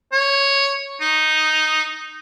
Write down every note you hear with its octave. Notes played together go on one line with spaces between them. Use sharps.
C#5
D#4